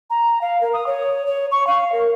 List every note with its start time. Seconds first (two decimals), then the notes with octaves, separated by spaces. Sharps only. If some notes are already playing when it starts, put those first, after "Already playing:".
0.10 A#5
0.41 F5
0.61 A#4
0.73 D#6
0.87 C#5
1.26 C#5
1.51 C#6
1.67 F5
1.92 A#4